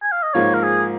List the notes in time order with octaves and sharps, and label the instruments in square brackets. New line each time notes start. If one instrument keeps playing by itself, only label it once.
[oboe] G#5
F5
D#5
[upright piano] G#2 F3 A#3 [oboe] C#5
[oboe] A#4
G#4